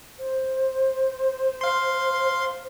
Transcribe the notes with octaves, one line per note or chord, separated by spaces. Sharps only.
C5
F5 C6